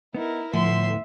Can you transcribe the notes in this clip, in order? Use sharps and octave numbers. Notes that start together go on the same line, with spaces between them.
B3 D#4 E4 A#4
D2 A2 F3 B3 E5 C6